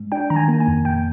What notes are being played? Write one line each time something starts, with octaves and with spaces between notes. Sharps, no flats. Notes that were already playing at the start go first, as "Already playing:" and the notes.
Already playing: G#2
D4 G5
D#3 A#5
G#5
A#3
G#5
F2
A#2 G5